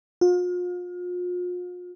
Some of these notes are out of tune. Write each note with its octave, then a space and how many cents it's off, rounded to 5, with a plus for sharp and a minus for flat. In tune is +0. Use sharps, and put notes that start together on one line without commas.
F4 +40